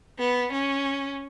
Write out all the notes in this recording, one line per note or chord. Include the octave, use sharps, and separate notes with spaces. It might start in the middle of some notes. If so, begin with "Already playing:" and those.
B3
C#4